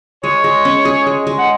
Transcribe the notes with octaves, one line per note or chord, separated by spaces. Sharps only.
G#3 C#5
G#3
C#4
G#4
G#3
G#3
F#5